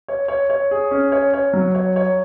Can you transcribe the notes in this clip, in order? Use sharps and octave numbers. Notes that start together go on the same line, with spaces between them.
C#5
C#5
C#5
G#4
C#4
C#5
C#5
F#3
C#5
C#5